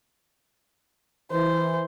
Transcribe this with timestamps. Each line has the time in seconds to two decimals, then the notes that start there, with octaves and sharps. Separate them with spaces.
1.31 E3 C5